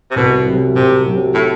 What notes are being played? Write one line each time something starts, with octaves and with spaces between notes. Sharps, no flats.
C3
C2 B2
C3 F#3
C2 C3
C3 F#3
A2